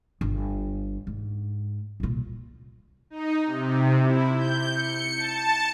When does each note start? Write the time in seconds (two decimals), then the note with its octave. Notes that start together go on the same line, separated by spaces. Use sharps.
0.21 G1
1.07 G#2
2.00 C2 A#2
3.10 D#4
3.46 C3
4.02 E4
4.37 G6
4.71 C#7
5.17 A5